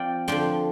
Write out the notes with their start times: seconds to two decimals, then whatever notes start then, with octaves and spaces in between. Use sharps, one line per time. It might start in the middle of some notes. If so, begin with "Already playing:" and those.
Already playing: F3 C4 D5 F5 G5
0.28 D3 F3 D4 G5 C6